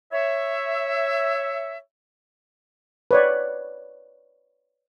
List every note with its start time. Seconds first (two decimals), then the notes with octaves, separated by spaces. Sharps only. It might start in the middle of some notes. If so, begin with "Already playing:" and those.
0.13 C#5 E5
3.11 B4 C#5 D5